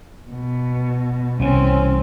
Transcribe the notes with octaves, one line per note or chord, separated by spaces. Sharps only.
B2
C2 E3 C4 C#4